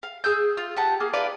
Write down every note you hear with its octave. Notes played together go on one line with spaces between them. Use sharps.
F5
G#4 E6 G6
F4
G4 F#5 A5
A#3 G#4 F6
D#4 F4 B4 D5